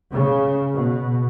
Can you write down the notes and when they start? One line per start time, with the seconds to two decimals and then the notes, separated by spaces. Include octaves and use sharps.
0.11 C#3
0.72 B2